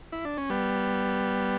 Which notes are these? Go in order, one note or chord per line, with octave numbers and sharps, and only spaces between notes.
E4
D4
C#4
G3 B3